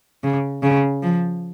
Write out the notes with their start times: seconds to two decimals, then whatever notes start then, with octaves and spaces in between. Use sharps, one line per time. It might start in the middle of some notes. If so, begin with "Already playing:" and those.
0.23 C#3
0.63 C#3
1.03 F3